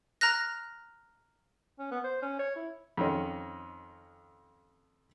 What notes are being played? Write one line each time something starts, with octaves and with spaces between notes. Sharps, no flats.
A#5 F6 F#6 A#6
C#4
B3
C5
C#4
C#5
E4
F2 D#3 C#4